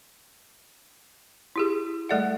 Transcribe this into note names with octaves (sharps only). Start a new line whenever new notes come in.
E4 G4 G#4
G3 A3 A4 D5 E5 F#5